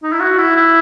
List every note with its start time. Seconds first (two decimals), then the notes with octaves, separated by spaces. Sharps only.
0.03 D#4
0.12 E4
0.20 F#4
0.38 E4
0.56 E4